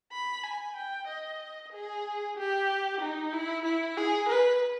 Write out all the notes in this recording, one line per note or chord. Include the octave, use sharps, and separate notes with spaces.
B5
G#5
G5
D#5
G#4
G4
D#4
E4
E4
G#4
B4